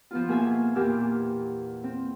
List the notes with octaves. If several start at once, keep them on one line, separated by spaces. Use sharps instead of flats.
F3 B3 F4
B2 A#3 G#4 E5 G#5 E6
E2 A#2 A#3 G4 E6
C4